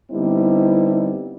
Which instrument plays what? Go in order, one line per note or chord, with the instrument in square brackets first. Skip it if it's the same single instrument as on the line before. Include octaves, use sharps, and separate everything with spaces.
[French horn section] D3 G3 B3 C4 D#4 E4